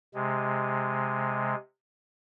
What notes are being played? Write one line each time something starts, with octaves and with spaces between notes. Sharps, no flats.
C3 G#3